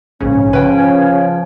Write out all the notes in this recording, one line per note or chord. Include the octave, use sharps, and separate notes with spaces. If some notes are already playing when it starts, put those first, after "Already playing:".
A#1 G#2 C#3 C#4
C#3 F3 B4 G5